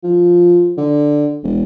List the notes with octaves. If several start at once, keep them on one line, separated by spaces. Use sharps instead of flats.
F3
D3
E1